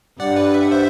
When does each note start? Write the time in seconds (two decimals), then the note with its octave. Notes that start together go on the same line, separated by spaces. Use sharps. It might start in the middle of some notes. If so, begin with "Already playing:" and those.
0.19 G2 D5 F#5
0.37 B4 D5
0.54 E5
0.63 F#5
0.71 C5 E5